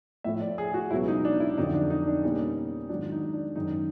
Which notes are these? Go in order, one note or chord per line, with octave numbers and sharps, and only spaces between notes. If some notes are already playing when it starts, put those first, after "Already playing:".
A2 F3 A3 E5
D5
G#4
F#4
C#2 B2 F#3 B3 E4
D#4
D4
E4
F2 D3 F#3 D#4
D4
D#4
D4
B2 G3 A#3 C#4 D#4
G#2 D#3 F#3 D4
D#4
D4
F#2 D#3 G#3 D#4